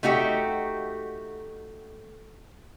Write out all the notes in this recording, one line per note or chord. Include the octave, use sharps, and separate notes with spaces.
A3 D#4 F#4 G4